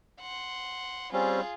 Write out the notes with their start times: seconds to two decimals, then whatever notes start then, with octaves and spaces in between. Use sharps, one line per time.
0.21 F#5 C6
1.13 G3 C4 C#4 F4 G#4